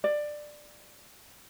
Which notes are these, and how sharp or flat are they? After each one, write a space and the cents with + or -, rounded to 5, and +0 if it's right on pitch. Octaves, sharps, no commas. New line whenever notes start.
D5 +15